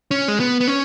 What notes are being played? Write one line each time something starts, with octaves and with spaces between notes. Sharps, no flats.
C#4
G#3
B3
B3
C#4